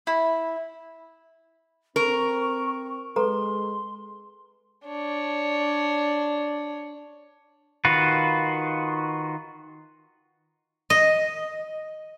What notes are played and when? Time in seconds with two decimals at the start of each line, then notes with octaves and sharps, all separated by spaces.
0.07 E4
1.96 C4 A#4 C#6
3.16 G#3 A4 B4 A#5 C6
4.88 D4 C#5
7.85 D#3 F4 F#4 B4
10.90 D#5